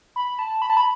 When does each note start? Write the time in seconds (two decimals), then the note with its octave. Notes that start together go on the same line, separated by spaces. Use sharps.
0.16 B5
0.39 A5
0.62 B5
0.70 A5
0.77 B5